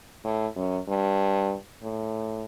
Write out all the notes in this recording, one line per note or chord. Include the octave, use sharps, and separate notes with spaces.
A2
F#2
G2
A2